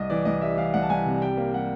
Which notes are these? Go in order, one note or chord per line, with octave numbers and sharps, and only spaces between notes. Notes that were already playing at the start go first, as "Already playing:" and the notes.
Already playing: C2 D#5
E3 D5
C2 D#5
G3 E5
E3 F5
C2 F#5
A5
C2 G#5
C3
G3 G5
A#3
G3 F#5